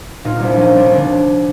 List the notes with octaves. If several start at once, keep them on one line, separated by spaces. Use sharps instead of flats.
A#2 D#4 F4
C2 D4 E4
F3 C#4 D#4
C#4
C2 C4 D4
D3 C4 D4